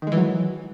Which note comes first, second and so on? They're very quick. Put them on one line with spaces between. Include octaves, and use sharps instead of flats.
D#3 G#3 E3 F#3